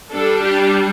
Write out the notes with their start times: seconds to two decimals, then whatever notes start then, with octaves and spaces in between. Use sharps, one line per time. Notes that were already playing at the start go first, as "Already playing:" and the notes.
0.13 G3 D4 A4
0.45 G4